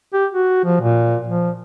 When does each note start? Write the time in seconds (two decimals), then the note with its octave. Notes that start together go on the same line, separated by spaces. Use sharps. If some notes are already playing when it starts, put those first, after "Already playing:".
0.13 G4
0.32 F#4
0.65 F3
0.81 A#2
1.28 F3